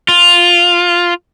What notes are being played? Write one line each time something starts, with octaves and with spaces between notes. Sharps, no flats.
F4